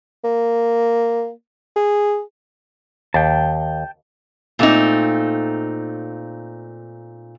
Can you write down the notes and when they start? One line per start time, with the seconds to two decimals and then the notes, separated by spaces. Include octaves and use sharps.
0.24 A#3
1.76 G#4
3.14 D#2 G5 A5
4.59 A#2 A3 C4 D#4